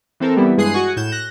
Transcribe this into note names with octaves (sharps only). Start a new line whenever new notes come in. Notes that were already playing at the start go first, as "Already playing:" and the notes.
E3 C4 A4 A#4
E3 G3 B3 E4
G2 G#3 G#4 D#6 F#6 C7
F#4 F#5 G#5 C#6
A2 G6 E7
F#6 A#6